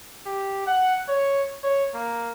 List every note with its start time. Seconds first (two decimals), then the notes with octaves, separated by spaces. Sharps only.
0.26 G4
0.67 F#5
1.08 C#5
1.64 C#5
1.94 A#3